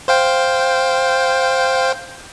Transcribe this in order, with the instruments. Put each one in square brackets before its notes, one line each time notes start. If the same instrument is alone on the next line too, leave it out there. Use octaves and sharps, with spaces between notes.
[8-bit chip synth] C5 F5 G5